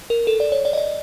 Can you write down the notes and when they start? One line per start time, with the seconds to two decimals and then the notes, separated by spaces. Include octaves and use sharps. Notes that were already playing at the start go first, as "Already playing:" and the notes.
0.10 A#4
0.27 A4
0.40 D5
0.52 C#5
0.65 D5
0.73 D#5
0.78 D5